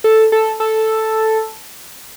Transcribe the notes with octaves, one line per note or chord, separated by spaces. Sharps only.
A4
A4
A4